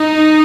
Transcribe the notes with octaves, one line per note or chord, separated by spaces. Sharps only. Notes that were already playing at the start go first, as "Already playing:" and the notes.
Already playing: D#4